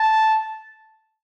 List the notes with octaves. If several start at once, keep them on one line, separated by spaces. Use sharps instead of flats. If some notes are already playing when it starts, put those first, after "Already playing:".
Already playing: A5